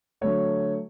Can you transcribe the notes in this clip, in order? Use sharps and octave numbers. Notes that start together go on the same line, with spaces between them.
D3 F#3 A3 C#5